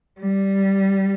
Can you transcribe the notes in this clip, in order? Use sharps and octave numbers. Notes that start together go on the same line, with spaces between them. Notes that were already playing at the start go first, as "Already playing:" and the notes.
G3